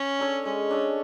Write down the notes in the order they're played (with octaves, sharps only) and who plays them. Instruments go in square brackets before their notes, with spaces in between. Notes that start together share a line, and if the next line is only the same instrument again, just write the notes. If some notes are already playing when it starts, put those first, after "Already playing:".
Already playing: [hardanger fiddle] C#4
[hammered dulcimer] D4 A4 C#5
[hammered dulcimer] G#3 [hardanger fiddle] C#4
[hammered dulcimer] D4 A4 C#5